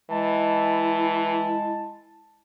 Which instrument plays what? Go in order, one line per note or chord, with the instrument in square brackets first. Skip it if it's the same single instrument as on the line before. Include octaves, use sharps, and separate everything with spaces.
[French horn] E3 [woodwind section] G#3 A5 [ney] E4